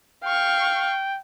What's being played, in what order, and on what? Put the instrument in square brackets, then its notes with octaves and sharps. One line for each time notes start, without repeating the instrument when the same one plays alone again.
[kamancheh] F5 C#6 [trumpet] G5